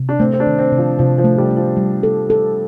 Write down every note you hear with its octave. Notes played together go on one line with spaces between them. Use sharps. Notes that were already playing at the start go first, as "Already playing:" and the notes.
Already playing: C3
D4
A3 C4
C4
D4
D#3
C4
C3
F3
C3 F3
F3
A3
G3
A3
F3
G3
A4
A4